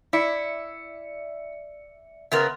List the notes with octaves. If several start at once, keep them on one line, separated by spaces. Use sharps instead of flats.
E4 D5 E5 C#7
C#3 B3 A#4 E5 C6